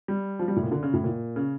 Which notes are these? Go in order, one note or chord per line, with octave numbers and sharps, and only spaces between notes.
G3
F3
G3
A2
A#2
D3
C#3
A2
A#2
C#3